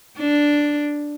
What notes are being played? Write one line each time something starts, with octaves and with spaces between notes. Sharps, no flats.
D4